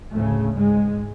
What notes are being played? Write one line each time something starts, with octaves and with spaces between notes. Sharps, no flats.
D2 A2 C#3 A3
G#2 G#3